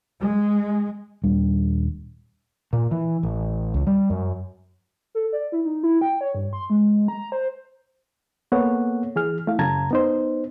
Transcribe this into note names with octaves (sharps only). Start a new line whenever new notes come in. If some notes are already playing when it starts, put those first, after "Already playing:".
G#3
D#1 G3 D4
A#2
E3
A1
C#2
G3
F#2
A4
D5
E4
D#4
E4
G5
C#5
G2
C6
G#3
A#5
C5
A#3 B3 A4 C#5 F#5
E3 G#4 F6
A3 E4 F5
F#2 C#3 A5 A#5 G#6
B3 D#4 C5